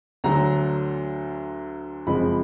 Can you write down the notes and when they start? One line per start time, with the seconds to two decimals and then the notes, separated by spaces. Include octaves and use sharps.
0.24 D2 D3 F#3 A#5
2.07 F#1 F2 F3 G#3 B5